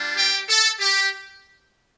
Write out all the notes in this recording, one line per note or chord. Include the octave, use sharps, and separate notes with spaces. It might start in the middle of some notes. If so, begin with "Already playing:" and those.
Already playing: G3 D4 F4
G4 G5
A4
G4